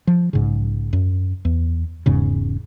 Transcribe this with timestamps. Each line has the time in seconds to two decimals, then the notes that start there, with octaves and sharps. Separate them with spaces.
0.07 F3
0.33 B1 G#2 C#3
0.93 F#2
1.45 E2
2.06 E1 E2 G#2 C#3